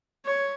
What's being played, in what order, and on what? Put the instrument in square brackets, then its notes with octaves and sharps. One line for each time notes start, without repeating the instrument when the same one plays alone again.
[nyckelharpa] C#5